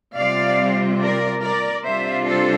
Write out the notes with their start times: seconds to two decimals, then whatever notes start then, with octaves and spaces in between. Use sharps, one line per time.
0.16 C3 G3 C4 F4 D5 F5
1.00 A#4 D5
1.42 A#4 D5
1.84 C3 G3 D4 F4 C5 E5
2.27 A4 C5